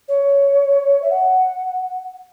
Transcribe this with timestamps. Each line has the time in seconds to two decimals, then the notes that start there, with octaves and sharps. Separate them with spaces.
0.08 C#5
1.02 E5
1.10 F#5